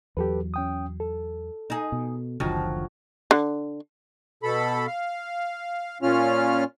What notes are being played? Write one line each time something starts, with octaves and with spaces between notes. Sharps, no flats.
E2 F#3 G4 A4 B4
C#4 G5 D#6
A4
D#4 G#4
B2
F#1 D2 D3 D#3 F3 F#3
D3
B2 A4 B5
F5
A#2 C#4 F4 F6